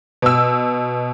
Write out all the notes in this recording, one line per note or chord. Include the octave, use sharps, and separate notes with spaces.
B2 E6